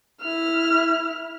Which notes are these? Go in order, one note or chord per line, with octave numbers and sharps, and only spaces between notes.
E4 F6